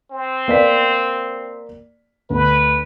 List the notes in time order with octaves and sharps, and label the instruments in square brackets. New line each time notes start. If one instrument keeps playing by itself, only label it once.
[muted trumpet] C4
[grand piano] A#3 D5 B6
[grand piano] D2 [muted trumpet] B4